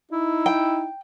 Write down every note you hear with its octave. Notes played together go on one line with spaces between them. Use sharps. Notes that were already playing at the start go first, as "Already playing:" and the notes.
D#4 E4
G5